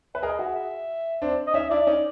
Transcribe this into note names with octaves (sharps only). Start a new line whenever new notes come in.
B4 E5
G#4 A#4 D#5
F#4 G#4 E5
E5
C4 D4
D#5
C#4 D#4 E5
D4 E4 D5
C#4 D#4